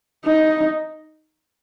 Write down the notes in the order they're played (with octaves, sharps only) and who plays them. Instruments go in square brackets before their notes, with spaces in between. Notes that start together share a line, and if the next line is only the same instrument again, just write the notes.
[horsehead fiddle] D#4